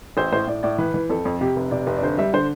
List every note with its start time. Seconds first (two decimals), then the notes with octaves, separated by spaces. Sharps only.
0.17 A1 C5
0.32 A2 C5
0.47 A2 D5
0.63 A2 D5
0.78 E3 B4
0.94 E3
1.10 F2 A4
1.25 F2
1.41 C3 G4
1.56 F1
1.71 C3 D5
1.87 F1
1.97 D5
2.02 D3 C5
2.18 G3 E5
2.33 D3 C5